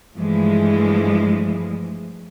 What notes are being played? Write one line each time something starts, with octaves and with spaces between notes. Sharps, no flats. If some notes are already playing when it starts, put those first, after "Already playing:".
G2 E3 F3 G#3 A3